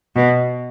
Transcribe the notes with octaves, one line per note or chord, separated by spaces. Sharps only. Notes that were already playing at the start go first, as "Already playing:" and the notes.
B2